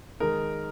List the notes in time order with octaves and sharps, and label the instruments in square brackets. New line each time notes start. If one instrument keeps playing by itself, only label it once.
[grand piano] D#3 G#3 D#4 A#4